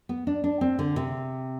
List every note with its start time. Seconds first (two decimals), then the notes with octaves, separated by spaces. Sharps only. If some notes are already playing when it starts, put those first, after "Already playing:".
0.09 B3
0.27 D4
0.44 D4
0.61 C4
0.79 D3
0.96 C3